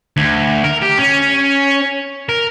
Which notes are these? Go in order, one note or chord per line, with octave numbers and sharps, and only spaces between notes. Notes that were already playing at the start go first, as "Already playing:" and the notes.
D2
A#4
G4
C#4
A#4